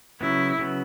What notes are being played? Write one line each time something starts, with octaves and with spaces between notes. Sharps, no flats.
C#3 F#3 B3 E4
C#3 F#3 B3